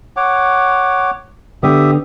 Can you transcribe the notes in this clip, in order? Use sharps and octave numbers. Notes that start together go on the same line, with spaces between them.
C#5 F#5 D6
D3 B3 G4 E5 D#6